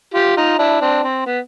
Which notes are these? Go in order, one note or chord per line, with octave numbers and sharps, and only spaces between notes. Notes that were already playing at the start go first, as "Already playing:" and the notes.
F4 G4
D#4 F4
D4 E4
C4 D4
C4
B3